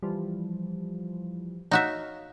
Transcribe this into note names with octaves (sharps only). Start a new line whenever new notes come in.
E3 F3 G3
D#4 F#4 C#5 E5 F5